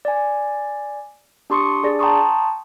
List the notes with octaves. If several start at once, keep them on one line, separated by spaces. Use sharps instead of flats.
D5 G#5
D4 G4 C6 C#6 D#6 C#7
D4 G#4 D5 A#6
G5 A5 A#5 C6 C#6 D#6